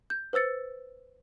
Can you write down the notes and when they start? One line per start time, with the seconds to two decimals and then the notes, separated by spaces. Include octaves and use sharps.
0.10 G6
0.33 B4 C5 E6 A6 C#7